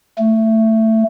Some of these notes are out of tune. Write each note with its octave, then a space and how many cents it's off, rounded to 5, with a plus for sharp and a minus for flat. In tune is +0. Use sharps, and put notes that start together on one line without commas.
A3 +15